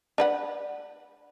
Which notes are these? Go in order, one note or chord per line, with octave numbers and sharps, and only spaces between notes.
D4 B4 F#5